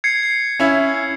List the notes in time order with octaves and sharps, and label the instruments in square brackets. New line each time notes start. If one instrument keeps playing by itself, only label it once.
[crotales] G#6 C7 C#7
C7
[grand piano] C#4 E4